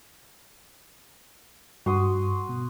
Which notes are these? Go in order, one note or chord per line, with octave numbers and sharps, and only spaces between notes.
G2 F#4 C6 D#6
B2